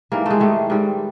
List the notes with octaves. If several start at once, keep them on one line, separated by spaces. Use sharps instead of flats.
G#2 E3 G3 A#3
G#3 A3
G#2 D#3 G3 A3
G#2 D#3 G3